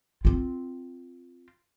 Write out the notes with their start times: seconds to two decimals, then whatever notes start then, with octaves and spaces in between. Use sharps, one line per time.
0.25 C4 F4